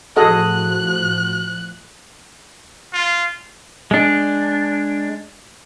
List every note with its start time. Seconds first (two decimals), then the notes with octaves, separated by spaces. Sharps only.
0.16 A2 F3 F#4 G#4 A4 D#5 F#6
2.93 F4
3.91 G#3 D4